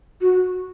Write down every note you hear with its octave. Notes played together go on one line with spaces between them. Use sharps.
F#4